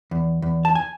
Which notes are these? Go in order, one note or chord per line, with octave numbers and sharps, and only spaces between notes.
E2
E2
A5
G#5